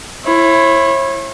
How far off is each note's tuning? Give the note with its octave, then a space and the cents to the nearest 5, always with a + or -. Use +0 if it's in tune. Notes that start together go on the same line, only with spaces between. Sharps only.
E4 +15 C#5 -40